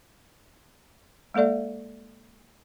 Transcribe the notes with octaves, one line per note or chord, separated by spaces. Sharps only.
G#3 A#3 A4 D5 E5